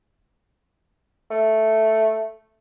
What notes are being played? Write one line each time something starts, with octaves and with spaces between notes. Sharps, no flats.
A3